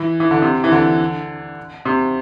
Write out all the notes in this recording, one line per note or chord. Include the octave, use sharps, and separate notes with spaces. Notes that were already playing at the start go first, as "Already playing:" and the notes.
Already playing: E3
E3
D3
C3
E3
D3
C3